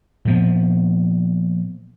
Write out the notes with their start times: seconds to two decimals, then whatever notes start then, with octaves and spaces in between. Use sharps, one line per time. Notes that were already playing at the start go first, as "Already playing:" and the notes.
0.25 A#2 F3 B3